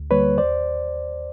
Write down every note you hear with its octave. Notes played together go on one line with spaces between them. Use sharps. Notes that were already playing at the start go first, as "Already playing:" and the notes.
Already playing: D2
D3 G3 A#3 B4 C#5
D#2 C5 D5